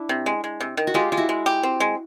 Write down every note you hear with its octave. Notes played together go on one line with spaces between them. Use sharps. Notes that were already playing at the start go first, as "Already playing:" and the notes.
Already playing: D4 E4
C3
G#3
G#3
C3
D#3
F#4
G#3 F4 G4
G#3 F4
E4 F#4
G#3
G4
C4
G#3